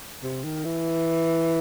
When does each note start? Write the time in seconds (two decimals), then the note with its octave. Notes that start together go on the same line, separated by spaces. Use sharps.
0.23 C3
0.44 D#3
0.65 E3